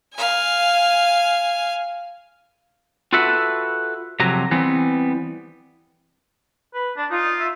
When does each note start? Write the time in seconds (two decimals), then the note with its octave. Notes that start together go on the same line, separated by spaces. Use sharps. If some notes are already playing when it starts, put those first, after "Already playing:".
0.14 F5 G#5
3.13 F4 F#4 A4 B4 E5 F#5
4.20 F2 C3 F#3 A#5
4.51 E3 G3 B3 C4
6.74 B4
6.97 D4
7.10 D#4 F4
7.39 E5